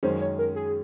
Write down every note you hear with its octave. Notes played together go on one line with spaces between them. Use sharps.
F#2 D#3 G#3 C#4 C5
C#5
A#4
G#4